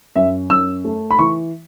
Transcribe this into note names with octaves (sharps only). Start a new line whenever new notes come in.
F#2 E5
F#2 E6
A3
B5
E3 C#6